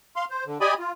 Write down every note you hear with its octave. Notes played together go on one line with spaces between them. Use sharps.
F5 C6
C5
D3
G4 D5 D#5 G#5 B5 D#6
F4